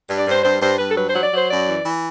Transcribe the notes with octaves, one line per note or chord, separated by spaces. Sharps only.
G2
D5
G2 C5
G2 C5
G2 C5
G2 B4
A4
F#3 B4
C5
F#3
D5
F#3 C5
F#2 D5
E3
E3